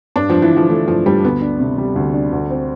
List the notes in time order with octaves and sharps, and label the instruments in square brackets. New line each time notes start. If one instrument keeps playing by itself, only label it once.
[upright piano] G2 [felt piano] D4
[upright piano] G2 [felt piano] F3
[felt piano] E3
[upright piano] D3 [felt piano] F3
[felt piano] E3 [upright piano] A3
[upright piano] G2 [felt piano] F3
[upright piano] G2 [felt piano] G3
[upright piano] D2 [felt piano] B3
[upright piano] D4
C3
G3
D2
D4
D2
C4